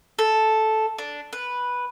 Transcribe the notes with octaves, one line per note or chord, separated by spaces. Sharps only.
A4
D4
B4